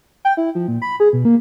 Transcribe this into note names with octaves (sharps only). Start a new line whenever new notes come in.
G5
E4
F3
A#2
B5
G#4
B2
A#3